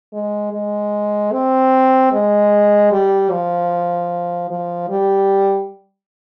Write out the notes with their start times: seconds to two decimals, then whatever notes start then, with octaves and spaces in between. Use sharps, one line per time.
0.13 G#3
0.53 G#3
1.32 C4
2.12 G#3
2.92 G3
3.31 F3
4.50 F3
4.89 G3